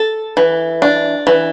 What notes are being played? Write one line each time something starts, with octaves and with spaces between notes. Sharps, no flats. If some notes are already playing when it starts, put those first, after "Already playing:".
Already playing: A4
E3
D4
E3